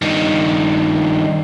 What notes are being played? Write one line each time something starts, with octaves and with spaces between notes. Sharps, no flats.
G2 D#3